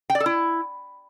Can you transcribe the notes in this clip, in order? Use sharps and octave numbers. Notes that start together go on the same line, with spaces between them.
G5
D5
A4
E4